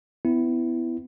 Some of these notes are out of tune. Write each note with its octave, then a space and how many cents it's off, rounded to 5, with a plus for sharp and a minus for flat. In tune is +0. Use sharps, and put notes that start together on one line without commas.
B3 +30 E4 +5